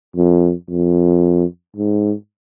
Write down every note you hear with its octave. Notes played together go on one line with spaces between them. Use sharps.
F2
F2
G#2